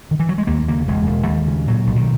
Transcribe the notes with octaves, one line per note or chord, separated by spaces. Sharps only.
D#3
E3
F#3
G#3
D#2 A#3
C#3 A#3
E1 G#3
E1
D#2
C#3
A#2 F#3
B1
D#3